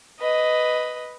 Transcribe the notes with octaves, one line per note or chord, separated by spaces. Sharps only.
B4 D#5